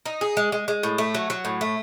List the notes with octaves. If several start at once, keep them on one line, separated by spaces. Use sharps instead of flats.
D#4
G#4
G#3
G#3
G#3
A2
A3
F#3
F#3
A2
A3